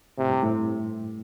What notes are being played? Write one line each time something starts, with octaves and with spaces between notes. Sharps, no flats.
A2 C3
G2
A2